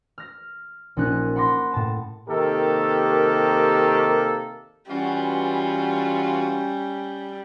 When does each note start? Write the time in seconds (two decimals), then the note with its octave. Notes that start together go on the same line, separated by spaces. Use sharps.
0.18 F6 A#6
0.97 A#1 C#4 D#4 F#6
1.36 F#5 B5 C6 D6 A#6
1.72 A2 A5 E7
2.28 C3 D#3 A#3 G4 A4 A#4
4.90 E3 G3 C#4 F4 F#4